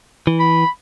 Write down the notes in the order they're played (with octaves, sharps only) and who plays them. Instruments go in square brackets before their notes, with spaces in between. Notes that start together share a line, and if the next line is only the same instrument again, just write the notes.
[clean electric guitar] E3
[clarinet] B5